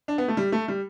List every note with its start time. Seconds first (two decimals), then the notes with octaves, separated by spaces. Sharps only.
0.08 D4
0.18 B3
0.28 A3
0.37 G3
0.52 A3
0.68 G3